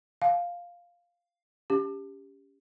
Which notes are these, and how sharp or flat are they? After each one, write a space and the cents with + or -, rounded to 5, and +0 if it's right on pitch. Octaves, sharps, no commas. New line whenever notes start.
F5 +0 G#5 +45
C#4 +20 G4 +15